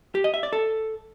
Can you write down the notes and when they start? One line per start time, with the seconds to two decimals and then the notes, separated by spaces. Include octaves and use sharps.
0.15 G4
0.24 D#5
0.34 E5
0.43 D5
0.53 A4